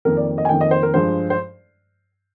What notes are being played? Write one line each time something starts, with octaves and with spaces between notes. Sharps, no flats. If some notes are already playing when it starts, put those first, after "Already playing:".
F2 D#3 A#3 A#4
D5
D#5
G#5
F2 D#3 A#3 G5
D#5
C5
A#4
G2 F3 G#3 C5
C5